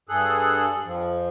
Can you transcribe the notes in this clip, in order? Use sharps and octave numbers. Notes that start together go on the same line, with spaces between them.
G2 G#4 A4 F#6
F2 F3